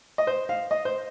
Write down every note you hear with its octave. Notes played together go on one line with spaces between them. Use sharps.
D#5
C5
F5
D#5
C5